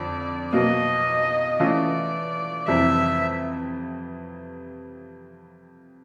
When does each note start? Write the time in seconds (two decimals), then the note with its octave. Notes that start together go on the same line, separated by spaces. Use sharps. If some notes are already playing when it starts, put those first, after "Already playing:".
Already playing: F2 D3 D5
0.52 B2 F#3 A#3 D#5
1.60 E3 A3 C#4 F4 D5
2.67 F2 C3 E3 G3 E5